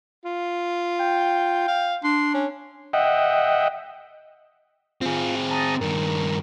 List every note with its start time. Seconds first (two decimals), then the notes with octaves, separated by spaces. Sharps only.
0.25 F4
1.00 G5
1.68 F5
2.04 D4 C6
2.34 C#4
2.93 D#5 E5 F#5 G5
5.01 C4 F4 G#4
5.51 A5 A#5 D#6
5.81 G2 D#3 A#4